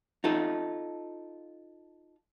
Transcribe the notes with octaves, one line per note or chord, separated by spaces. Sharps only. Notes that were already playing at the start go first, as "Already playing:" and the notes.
D#4 F4 A4